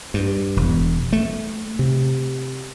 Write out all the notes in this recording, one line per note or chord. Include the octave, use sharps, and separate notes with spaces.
G2
E1
A3
C3